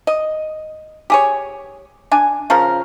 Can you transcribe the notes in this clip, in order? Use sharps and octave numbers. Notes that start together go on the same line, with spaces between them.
D#5
G4 G#4 C#5
D4 G#5
C#3 F3 A#4